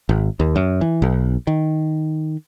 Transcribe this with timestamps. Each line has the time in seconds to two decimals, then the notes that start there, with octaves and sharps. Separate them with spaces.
0.09 G#1
0.40 D#2
0.56 F#2
0.81 E3
1.02 B1
1.47 D#3